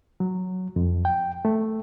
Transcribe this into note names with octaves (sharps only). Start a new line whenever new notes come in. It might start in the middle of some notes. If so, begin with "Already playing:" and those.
F#3
F2
G5
A3